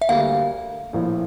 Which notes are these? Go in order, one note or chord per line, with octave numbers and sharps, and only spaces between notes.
E5
D2 D3 G3 A#3 F5
A#1 A2 F3 A#3 E4